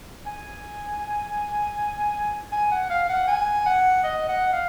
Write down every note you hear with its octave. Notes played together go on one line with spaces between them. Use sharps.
G#5
G#5
F#5
F5
F#5
G#5
F#5
D#5
F#5
F5